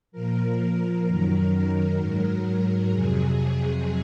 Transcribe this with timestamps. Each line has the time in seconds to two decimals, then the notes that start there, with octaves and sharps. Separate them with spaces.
0.12 A#2 F3 A#4
1.06 F#2 D#3 F#3
1.98 G#2 F#3 A#4
2.91 F2 C3 F#3 G#4